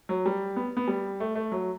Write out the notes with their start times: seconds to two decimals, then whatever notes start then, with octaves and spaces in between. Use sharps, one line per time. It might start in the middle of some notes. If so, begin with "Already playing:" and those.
0.09 F#3
0.26 G3
0.56 B3
0.77 B3
0.88 G3
1.20 A3
1.35 A3
1.52 F#3